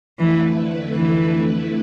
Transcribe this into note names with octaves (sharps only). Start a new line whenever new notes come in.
F2 D3 E3 A3 E4 B4
E3